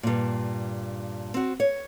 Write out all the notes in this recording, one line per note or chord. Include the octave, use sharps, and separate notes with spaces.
G2 A#2
C4 F#4
C#5